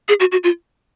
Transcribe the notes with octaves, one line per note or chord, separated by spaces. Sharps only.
G#4
F#4
F#4
F4